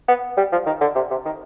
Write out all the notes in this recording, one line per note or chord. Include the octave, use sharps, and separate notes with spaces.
B3
G3
F3
D#3
D3
C3
C3
D#3